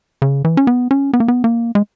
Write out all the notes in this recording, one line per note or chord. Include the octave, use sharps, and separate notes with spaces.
C#3
E3
C#4
B3
C#4
B3
A#3
B3
A#3
G#3